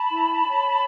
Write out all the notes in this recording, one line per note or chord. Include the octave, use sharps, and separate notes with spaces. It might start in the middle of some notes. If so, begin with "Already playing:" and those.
Already playing: A5 B5
E4
C#5